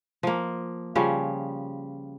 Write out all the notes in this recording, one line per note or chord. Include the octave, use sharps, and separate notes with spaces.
F3 A#3
C#3 F3 G3 C#4